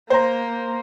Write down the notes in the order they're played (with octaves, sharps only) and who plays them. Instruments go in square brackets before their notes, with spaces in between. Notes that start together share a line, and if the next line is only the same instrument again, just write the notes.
[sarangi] A#3 [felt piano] C5 A#5